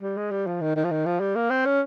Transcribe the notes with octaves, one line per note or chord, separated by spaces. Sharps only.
G3
G#3
G3
F3
D#3
D#3
F3
D#3
F3
G3
A#3
C4
C#4